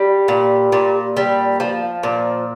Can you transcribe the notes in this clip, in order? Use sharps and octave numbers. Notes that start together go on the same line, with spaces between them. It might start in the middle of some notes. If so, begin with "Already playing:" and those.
Already playing: G3
A#2
A#2
G3
F3
A#2